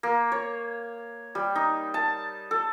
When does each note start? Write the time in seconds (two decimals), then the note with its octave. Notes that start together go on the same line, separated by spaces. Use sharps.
0.03 A#3
0.32 C#5
1.35 G3
1.55 D#4
1.94 A5
2.51 A4